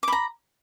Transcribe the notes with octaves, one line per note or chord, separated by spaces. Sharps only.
A#5 B5 D6